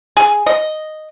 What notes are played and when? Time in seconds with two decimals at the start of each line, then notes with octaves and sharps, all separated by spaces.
0.17 G#4
0.46 D#5